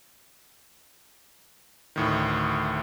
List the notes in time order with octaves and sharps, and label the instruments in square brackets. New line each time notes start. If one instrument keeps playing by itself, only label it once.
[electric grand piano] D2 A2 D#3